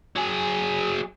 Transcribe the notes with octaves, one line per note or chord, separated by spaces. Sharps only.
F#3 G#4